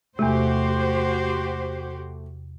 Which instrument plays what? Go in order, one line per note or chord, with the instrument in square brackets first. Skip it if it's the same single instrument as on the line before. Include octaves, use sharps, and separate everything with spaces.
[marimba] E2 C3 [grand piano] A3 [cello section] F#4 G4 C5